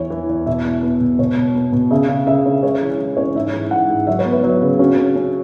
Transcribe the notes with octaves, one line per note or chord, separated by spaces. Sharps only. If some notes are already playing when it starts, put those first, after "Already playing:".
Already playing: E2 E3 C#5
E3
E2
B2 E5
E2
B3
B2
B2 C#5
B2
B3
B2
C#3 E5
C#3
C#3 E5
C#4
G#3 C#5
E3
E3
C#4 C#5
G#2 E5
E3
G#2 F#5
G#2
F#3 E5
C#5
B3
B4
F#3
C#3
C#4 F#4
C#4
C#4